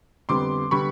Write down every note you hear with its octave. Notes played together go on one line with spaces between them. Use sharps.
F2 D3 G3 B3 C6 D6
D3 G3 B3 B5 C#6